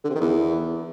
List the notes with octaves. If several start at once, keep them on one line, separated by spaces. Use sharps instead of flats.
D3
C3
D#3
E2